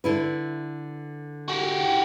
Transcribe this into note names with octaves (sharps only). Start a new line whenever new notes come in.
D3 E4 B4
F#4 G4